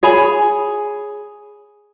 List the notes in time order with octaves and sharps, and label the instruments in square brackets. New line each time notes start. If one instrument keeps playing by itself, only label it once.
[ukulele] G#4 C#5 G#5 B5